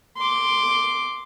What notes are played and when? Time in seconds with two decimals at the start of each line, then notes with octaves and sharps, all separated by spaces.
0.17 C6 D6